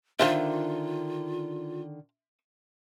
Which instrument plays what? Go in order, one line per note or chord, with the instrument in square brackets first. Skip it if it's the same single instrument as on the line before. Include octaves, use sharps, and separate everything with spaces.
[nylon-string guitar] D3 D#3 D4 [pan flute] F4 [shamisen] A#4 C5 F5 [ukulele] E5